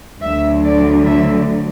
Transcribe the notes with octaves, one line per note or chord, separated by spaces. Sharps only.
D2 D3 F#3 E5
D5
E5